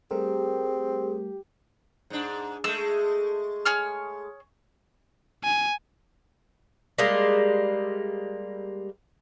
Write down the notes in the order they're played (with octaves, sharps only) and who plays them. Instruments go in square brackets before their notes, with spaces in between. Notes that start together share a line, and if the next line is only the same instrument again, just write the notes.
[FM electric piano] G3 A3 A#4 [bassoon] C4 [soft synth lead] G4 [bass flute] G#4
[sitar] G#2 D4
[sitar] G#3 A3 [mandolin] E6
[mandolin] G#4 C#5 F6
[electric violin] G#5
[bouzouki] G3 G#3 A#3